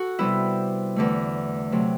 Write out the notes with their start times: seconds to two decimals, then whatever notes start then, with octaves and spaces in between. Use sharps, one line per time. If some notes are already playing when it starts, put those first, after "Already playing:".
Already playing: F#4 A4
0.19 C3 G3 B3 E4
0.96 E2 D3 A3
1.72 C3 F#3 A3